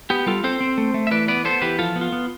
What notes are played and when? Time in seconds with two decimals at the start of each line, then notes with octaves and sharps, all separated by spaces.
0.10 B3 G4
0.26 G3 F4 A4
0.44 C4 A4 C5
0.61 C4
0.78 A3
0.94 A3
1.07 E5
1.11 E3 B4 D5
1.28 B3 B4 D5
1.45 B3 A4 C5
1.62 E3 G4 B4
1.79 F3 F4 A4
1.96 B3
2.01 F4
2.12 B3